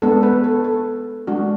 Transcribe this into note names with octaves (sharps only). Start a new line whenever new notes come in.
G#3 B3 D4 A4
B4
A4
A4
G#3 D4 F#4